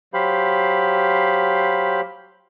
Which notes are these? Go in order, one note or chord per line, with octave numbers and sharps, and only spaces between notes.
F#3 G4 C5 F5 B5